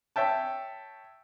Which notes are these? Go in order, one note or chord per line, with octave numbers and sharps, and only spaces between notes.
C#5 E5 G5 A5